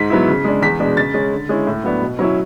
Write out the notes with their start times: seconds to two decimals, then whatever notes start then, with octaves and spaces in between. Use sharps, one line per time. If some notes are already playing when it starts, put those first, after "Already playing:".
Already playing: G#2 B6
0.10 F#3 B3 E4
0.28 C#3
0.44 G#3 D4
0.62 E2 B6
0.80 B2 G#3 D4
0.97 C#3 A6
1.14 G#3 C#4
1.32 D3
1.49 G#3 C#4 E4
1.67 A2
1.84 F#3 B3 D4
2.01 B2
2.19 F#3 C#4 E4